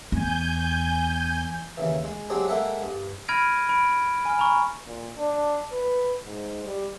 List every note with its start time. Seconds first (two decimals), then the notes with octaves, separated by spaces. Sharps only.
0.12 E2 G#5 G6
1.77 D#2 C#3 E3
2.05 G#3
2.30 F#3 G#3 C4 D4 G4 G#4
2.48 G#3 A#3 A4 E5 F#5
2.82 G2
3.28 B5 F6 G#6 A#6 D7 D#7
3.69 B5 D7
4.25 G#5 F6
4.39 A#5 B5 C#6
4.87 A#2
5.17 D4
5.73 B4
6.24 G#2
6.65 G3